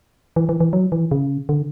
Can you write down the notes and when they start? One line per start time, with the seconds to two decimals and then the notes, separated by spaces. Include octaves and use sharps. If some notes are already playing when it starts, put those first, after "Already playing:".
0.36 E3
0.49 E3
0.60 E3
0.73 F#3
0.92 E3
1.11 C#3
1.49 D3